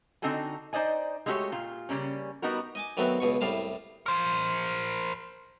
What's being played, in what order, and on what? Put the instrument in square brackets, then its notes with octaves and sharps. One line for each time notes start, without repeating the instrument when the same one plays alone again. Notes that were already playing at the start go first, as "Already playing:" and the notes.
[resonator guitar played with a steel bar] D3 C4 D#4 F#4 A4 G#5
D#4 C5 D5 D#5 G#5
G#3 A3 D#4 F#4 G4 C#5
A#2 F4
C#3 G3 A#3 C#4
G3 B3 D#4 F#4 A#4
[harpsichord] D#5 G#5 D6
D#3 F#3 A3 B3 C4 F#4
C#2 B2 C#6
C2 A2 G3 F5 A5
[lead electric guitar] A#4 C5